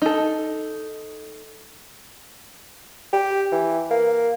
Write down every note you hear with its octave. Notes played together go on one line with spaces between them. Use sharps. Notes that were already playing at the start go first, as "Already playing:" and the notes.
D#4 A4
G4
E3
A#3